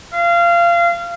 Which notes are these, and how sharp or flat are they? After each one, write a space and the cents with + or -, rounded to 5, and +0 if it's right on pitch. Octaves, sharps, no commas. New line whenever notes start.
F5 -25